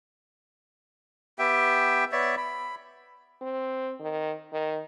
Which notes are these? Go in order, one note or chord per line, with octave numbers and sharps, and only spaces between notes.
B3 G4 E5 G5
B3 C#5 D5 E5
B5
C4
D#3
D#3